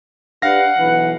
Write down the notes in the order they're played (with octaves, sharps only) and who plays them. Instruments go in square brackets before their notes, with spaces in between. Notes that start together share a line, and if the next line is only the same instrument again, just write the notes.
[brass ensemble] D4 G4 B4 [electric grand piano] F5 A#6 [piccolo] F#5
[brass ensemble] B1 E3 B4